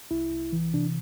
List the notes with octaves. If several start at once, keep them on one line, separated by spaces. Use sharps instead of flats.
C2 E4
C2
E3
C3 D4